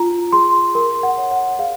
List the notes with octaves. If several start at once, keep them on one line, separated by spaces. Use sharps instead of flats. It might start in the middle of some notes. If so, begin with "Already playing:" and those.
Already playing: F4 A#5
G#4 C6
A#4 C6
F#5
C#5
F#5
G#4 F5